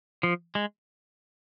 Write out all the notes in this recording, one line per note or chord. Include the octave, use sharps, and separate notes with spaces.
F3
G#3